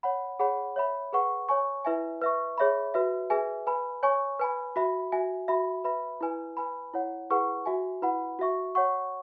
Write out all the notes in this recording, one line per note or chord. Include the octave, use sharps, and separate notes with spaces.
C#5 F#5 B5
G#4 C#5 F#5 B5
C#5 E5 B5
G#4 B4 F#5 C#6
C#5 G#5 C#6
E4 B4 E5 G#5
B4 E5 C#6
G#4 C#5 E5 B5
F#4 B4 E5
G#4 B4 E5 G#5
B4 G#5 B5
C#5 G#5 C#6
B4 G#5 B5
F#4 E5 B5
F#4 E5 G#5
F#4 E5 B5
B4 E5 B5
E4 B4 G#5
B4 G#5 B5
E4 C#5 F#5
E4 G#4 B4 F#5 C#6
F#4 E5 G#5
E4 B4 F#5 B5
F#4 E5 C#6
C#5 F#5 C#6